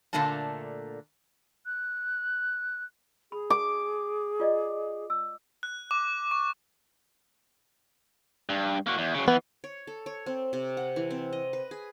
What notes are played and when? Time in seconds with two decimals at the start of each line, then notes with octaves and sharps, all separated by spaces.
0.13 A#2 D3 A3 A#3 D4 A5
1.66 F#6
3.32 G#4 B5
3.50 D6
4.40 F4 D5 D#5
5.10 E6
5.63 F#6
5.91 D6
6.31 C#6
8.49 G2
8.87 A#3 F#4
8.98 E2
9.14 C#3 F#3
9.28 E3 B3
9.64 C#5
9.87 A4
10.06 C#5
10.26 C4
10.53 C3
10.77 F#5
10.96 E3
11.10 C4
11.33 D#5
11.53 B4
11.71 G#4